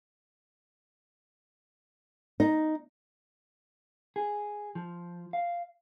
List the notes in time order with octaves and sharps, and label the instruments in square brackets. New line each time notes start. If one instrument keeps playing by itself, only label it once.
[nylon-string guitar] D#4
[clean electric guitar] G#4
F3
F5